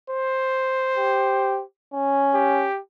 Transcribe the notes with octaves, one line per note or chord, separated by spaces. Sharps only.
C5
G4
C#4
G4